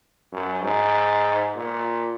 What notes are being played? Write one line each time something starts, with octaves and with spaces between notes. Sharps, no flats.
F#2
G#2
A#2